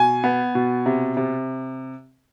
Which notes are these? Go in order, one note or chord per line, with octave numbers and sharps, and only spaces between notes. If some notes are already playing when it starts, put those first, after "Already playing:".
Already playing: B2 G#5
B3
B2
C3
C3